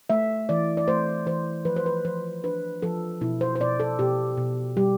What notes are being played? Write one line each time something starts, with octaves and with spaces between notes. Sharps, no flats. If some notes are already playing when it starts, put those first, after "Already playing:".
A3 E5
E3 D5
D5
A3 C5
E3 C5
F3 B4
C5
B4
F3 C5
D4 B4
F3 A4
B2 E4
C5
C5
B2 D5
A4
B2 G4
B2
G3 G4